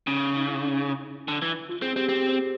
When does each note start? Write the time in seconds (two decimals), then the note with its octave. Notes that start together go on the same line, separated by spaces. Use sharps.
0.07 C#3 C#4
0.37 D#4
0.48 E4
1.28 D3
1.42 E3
1.69 F4
1.82 C4 G#4
1.96 C4 G4
2.09 C4 G4
2.29 C5